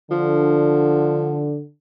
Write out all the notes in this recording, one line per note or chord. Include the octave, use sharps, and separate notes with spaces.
D3 F3